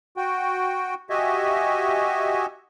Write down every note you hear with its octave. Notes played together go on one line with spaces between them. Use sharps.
F#4 G5
F#4 G4 D#5 E5 G#5